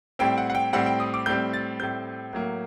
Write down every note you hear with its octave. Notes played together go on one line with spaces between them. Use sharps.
A2 G3 C4 G5
F#5
F#5
G5
A2 G3 C4 F#5
G5
D#6
D6
A2 G3 C4 G6
A6
A2 G3 C4 G6
A2 F#3 A#3